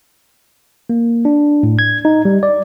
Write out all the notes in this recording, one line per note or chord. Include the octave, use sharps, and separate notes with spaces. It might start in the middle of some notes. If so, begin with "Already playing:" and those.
A#3
D4
A2
G#6
D#4
G3
D5